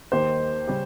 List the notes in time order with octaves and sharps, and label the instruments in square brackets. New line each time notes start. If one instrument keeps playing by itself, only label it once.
[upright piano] D#2 D#3 A#3 D#4 G4 [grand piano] C5
[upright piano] C#3 G3 C#4 G4